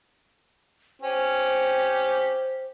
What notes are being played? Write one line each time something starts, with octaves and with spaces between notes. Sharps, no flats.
C#4 G4 C5